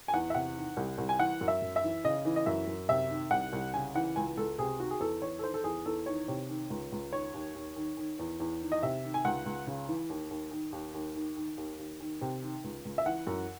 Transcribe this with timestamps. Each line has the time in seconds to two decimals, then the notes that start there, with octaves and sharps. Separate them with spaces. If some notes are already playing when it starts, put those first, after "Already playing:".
0.08 G#5
0.14 E2 F#5
0.30 E5
0.35 C3 F#5
0.56 D#3
0.77 C2
0.98 C2
1.09 G#5
1.19 E3 F#5
1.41 F#2
1.48 E5
1.62 F#2
1.76 E5
1.84 E3
2.05 C#3 D#5
2.25 E3
2.36 D#5
2.46 F#2 E5
2.67 F#2
2.89 C3 E5
3.10 D#3
3.31 C2 F#5
3.53 C2
3.74 C#3 G#5
3.95 E3 F#5
4.16 C#2 G#5
4.37 C#2 A4
4.58 C3 G#4
4.80 D#3 F#4
4.91 G#4
5.00 E2 A4
5.22 E2 C#5
5.39 A4
5.44 D#3 C5
5.54 A4
5.64 E2 G#4
5.86 E2 A4
6.06 D#3 C#5
6.28 C3 C#5
6.49 D#3
6.70 C#2
6.92 C#2
7.12 D#3 C#5
7.34 D#2
7.55 D#2
7.76 D#3
7.97 D#3
8.19 E2
8.40 E2
8.61 D#3
8.72 D#5
8.83 C3 E5
9.04 D#3
9.14 G#5
9.25 C#2 F#5
9.46 C#2
9.67 C#3
9.88 E3
10.09 D#2
10.30 D#2
10.51 D#3
10.72 D#2
10.94 D#2
11.15 D#3
11.37 D#3
11.57 D#2
11.79 D#2
12.00 D#3
12.21 C3
12.42 D#3
12.64 C#2
12.85 C#2
12.98 E5
13.06 E3 F#5
13.27 F#2